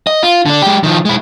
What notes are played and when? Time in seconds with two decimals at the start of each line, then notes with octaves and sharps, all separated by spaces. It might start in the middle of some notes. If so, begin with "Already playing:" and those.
0.07 D#5
0.23 F4
0.46 D3 D4
0.62 G#3 G4
0.83 D#3 F3
1.05 G#3 E4